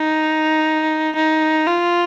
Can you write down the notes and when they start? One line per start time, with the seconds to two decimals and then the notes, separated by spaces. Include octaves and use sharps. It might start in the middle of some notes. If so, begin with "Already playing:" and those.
Already playing: D#4
1.16 D#4
1.68 F4